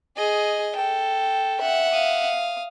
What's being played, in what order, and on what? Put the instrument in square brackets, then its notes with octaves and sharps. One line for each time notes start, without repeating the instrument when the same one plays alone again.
[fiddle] G#4 [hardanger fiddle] D#5
[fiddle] A4 [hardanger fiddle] G5
[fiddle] E5 F#5
[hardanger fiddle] F5 D#6